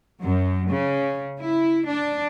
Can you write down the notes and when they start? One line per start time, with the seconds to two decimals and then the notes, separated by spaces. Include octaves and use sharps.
0.22 F#2
0.70 C#3
1.41 E4
1.87 D4